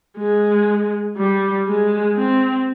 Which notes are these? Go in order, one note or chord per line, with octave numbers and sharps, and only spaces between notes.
G#3
G3
G#3
C4